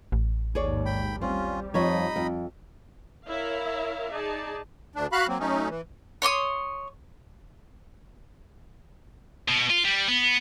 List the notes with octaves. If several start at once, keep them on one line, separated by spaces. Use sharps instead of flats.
A1
D#2 G#2 G#4 C#5 D5
G5 B5
G3 C4 C#4 F4
F2 F3 D#4 C#5 D#5 B5
F2
E4 A#4 C#5 E5 F5
D#4 G#4 D5 A5
D2 D4
F#4 F5 B5 F#6
F#3 A#3 C4
F#3 A3 C#4 D#4
E3
C#5 C6 C#6 D#6
B2
F4
G3
B3